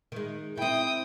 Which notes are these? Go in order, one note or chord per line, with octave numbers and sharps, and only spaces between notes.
D#3 G#3
C4 E4 G5 D#6